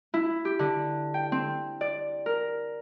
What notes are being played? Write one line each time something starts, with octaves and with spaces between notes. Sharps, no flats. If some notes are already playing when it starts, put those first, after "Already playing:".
E4
G4
D3
G5
C4
D5
A#4